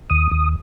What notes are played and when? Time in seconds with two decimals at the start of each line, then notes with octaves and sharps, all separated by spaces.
0.10 D#2 D#6
0.32 D#2